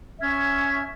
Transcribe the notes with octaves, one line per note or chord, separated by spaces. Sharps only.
C#4 E5 F6 G#6